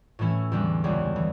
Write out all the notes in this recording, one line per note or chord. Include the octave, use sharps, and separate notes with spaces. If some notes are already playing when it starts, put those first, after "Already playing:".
A2 E3 A3 C#4 E4
E2 D3 G3 D4
C#2 C#3 G3 B3
E3